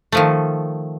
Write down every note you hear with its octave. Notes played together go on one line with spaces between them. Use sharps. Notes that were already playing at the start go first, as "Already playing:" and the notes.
D#3 F3 A3